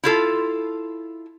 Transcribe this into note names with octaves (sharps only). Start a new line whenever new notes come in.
E4 F4 A4